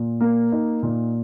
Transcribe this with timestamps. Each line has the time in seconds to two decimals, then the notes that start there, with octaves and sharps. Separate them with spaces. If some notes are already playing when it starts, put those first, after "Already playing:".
Already playing: A#2
0.20 A#3
0.52 D#4
0.83 A#2